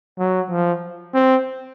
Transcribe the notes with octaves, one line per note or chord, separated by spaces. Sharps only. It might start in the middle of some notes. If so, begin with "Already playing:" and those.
F#3
F3
C4